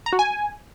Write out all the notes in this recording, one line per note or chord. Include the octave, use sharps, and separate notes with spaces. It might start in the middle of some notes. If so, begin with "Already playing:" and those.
A#5
F#4
G#5